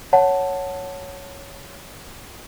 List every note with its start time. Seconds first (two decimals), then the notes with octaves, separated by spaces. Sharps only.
0.13 C#5 F#5 A5